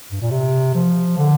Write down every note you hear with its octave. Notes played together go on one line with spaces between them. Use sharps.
G2
A#2
C3
F3
D3